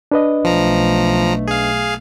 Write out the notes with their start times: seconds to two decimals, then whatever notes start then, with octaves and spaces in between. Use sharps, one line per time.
0.12 D4 B4 D#5
0.45 B1 F3 A3 A#5
1.48 G#4 F5